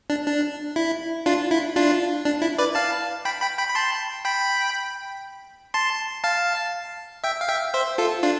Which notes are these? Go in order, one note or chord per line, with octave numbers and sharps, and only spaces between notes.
D4
D4
E4
D4 F4
E4
D4 F4
D4
E4
B4 D5
F5 A5
G5 B5
G5 B5
G5 B5
B5
A5 C6
G5 B5
A5 C6
F5 A5
E5 G5
F5
E5 G5
C5 E5
F4 A4
D4 F4